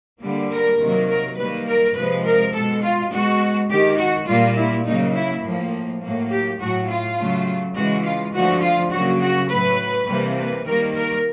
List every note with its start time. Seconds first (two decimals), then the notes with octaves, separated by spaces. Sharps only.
0.21 D3 G3 A#3
0.50 A#4
0.78 C3 D#3 F#3 A#3
1.08 A#4
1.37 D#3 G3 A#3 B4
1.66 A#4
1.94 C3 F3 G#3 B4
2.24 A#4
2.53 B2 G#3 A4
2.82 F4
3.11 B2 G#3 F#4
3.69 D#3 G#3 G4
3.98 F#4
4.27 A#2 G3 A#3 F4
4.56 E4
4.85 C#3 F#3 A#3 D#4
5.14 E4
5.43 A2 F3 A#3
6.01 A2 F#3 A#3
6.30 G4
6.59 A2 F#3 A3 F#4
6.88 F4
7.17 C#3 F#3 A3
7.75 C#3 E3 G#3 F#4
8.04 F4
8.33 D3 F3 A3 F#4
8.62 F4
8.91 C#3 F#3 A#3 F#4
9.20 F#4
9.49 A2 F#3 A3 B4
10.07 C3 E3 G3 A#3
10.36 B4
10.65 D#3 G3 A#3 A#4
10.94 A#4